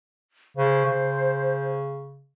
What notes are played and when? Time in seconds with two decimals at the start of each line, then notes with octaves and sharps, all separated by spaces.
0.57 C#3 C5
0.86 C#3